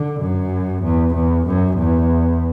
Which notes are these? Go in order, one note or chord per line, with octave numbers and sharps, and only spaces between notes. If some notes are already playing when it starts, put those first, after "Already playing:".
Already playing: D3
F#2
E2
E2
F#2
E2